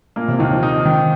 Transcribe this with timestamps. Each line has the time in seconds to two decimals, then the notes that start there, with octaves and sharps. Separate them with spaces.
0.16 A#2 A#3
0.28 C3
0.39 D#2 D#3
0.51 F3
0.63 D#4
0.85 D#3